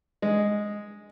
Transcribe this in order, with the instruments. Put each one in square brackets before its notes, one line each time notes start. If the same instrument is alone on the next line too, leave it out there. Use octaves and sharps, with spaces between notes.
[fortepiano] G#3